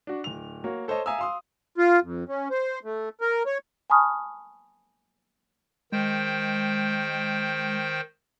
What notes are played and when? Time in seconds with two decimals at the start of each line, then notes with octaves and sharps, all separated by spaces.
0.07 D4 F#4
0.24 D1 F7
0.64 A#3 F#4 C#5
0.88 A4 C5 C#5 D#5 A5
1.06 E5 F5 G#5 A#5 D#6 E6
1.19 F5 C6 D#6
1.78 F4
2.03 F2
2.29 C#4
2.50 C5
2.84 A3
3.21 A#4
3.46 C#5
3.90 G#5 A5 B5 C#6 D#6 F6
5.92 D#3 G#3 C5 G5